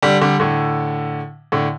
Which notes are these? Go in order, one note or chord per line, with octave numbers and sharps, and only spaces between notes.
D3 G3
D3 G3
A2 D3
A2 D3